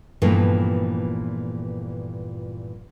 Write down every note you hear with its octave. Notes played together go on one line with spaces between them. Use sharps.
G2 A#2 E3 F3 A3 B3